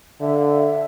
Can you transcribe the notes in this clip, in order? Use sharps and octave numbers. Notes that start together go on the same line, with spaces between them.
D3 E5
F5
E5